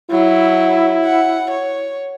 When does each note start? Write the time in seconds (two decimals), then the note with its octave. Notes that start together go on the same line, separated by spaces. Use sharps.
0.11 F#3 E4
1.05 F#5
1.50 C#5